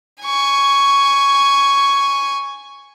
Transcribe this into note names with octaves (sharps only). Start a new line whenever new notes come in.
G#5 C#6